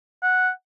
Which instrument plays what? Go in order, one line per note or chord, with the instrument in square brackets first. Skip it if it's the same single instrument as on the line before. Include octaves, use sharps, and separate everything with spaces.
[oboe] F#5